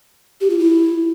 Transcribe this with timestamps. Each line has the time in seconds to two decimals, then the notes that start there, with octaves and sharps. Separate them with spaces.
0.41 G4
0.50 F4
0.59 E4